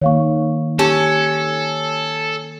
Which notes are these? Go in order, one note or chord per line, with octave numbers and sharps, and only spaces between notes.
D#3 A#3 C#5 F5 C#6
C#4 G4 A4 A5